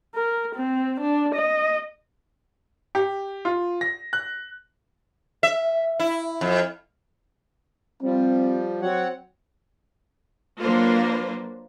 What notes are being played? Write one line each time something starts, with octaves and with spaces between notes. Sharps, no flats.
A#4
C4
D4
D#5
G4
F4
A#6
F#6
E5
E4
F2
F3 G3 C4
F#3 C4 C#5 F#5
F#3 A#3 D4 F4 B4 C5